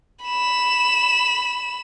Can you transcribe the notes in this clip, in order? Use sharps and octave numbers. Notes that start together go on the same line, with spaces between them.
B5 E7